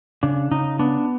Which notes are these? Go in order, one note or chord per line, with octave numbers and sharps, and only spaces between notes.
C#3 D4
C#3 D#4
B3 D4